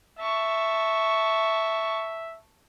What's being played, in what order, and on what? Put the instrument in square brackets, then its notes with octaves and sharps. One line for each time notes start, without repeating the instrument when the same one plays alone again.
[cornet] E5 [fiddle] A5 C#6